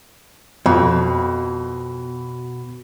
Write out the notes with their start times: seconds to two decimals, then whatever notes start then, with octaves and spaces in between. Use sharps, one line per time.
0.66 F2 B2